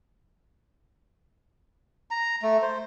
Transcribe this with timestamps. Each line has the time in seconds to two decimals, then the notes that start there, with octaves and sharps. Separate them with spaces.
2.11 A#5
2.42 A3
2.62 C5